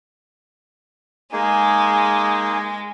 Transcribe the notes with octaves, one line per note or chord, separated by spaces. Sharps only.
G#3 A#3 D#4 G#4